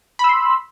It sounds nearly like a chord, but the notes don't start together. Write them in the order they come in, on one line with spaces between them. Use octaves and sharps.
B5 E6 C6